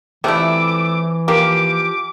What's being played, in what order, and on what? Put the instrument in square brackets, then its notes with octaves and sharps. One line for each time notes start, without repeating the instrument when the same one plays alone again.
[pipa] C3 F3 G3 [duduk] E3 [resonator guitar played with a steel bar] A3 E4 [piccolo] D6
[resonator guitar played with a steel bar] F3 G4 [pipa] A#3 [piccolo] D6